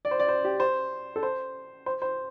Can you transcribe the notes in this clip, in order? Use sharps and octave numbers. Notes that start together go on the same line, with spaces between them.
D5
C5
D5
C5
G4
C5
A4
C5
C5
C5